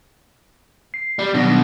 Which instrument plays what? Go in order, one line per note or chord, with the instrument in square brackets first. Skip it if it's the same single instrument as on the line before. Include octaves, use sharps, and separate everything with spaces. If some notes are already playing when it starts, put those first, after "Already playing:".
[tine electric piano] C7
[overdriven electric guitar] G3
[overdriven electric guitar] B2 F#3 [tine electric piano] D#3 G3 D4